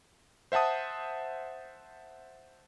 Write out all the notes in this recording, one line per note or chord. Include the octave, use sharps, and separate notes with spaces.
C5 E5 F#5 A5 D#6